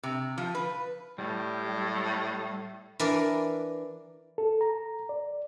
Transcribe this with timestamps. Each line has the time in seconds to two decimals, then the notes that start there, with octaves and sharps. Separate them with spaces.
0.03 C3
0.38 F3
0.55 B4
1.18 A2 G3
3.00 E3 D4 A#4 D5
4.38 A4
4.61 A#5
5.09 D5